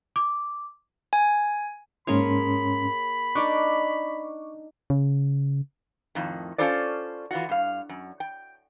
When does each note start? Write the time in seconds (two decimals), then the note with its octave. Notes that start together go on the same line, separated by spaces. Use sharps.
0.16 D6
1.13 G#5
2.07 G#2 A#3 C#4 G#4 C#5 B5 C6
3.35 D4 D#4 D5 C#6 D6
4.90 C#3
6.15 F2 A2 D#3
6.58 C#4 D#4 F4 A4 C5 D5
7.31 E3 F4 F#4
7.49 G2 F5
7.89 F#2
8.20 G5